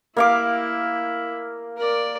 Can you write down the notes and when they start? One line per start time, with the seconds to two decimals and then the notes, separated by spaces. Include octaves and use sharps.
0.17 A#3 E4 F5 D6
1.77 A#4 D5